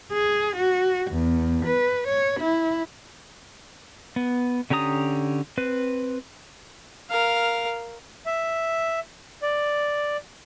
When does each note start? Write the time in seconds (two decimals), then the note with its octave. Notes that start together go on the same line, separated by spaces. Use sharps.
0.13 G#4
0.57 F#4
1.11 E2
1.66 B4
2.08 C#5
2.41 E4
4.16 B3
4.70 D3 C#4 G4 A#5 D#6
5.58 C4 B4
7.10 A#4 F5
8.26 E5
9.42 D5